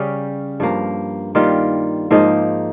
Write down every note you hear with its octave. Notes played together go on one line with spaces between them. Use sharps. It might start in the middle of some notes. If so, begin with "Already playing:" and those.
Already playing: C#3 G3 C#4 G4
G2 F3 A#3
D#3 G3 A#3 F4
G#2 F3 A#3 D#4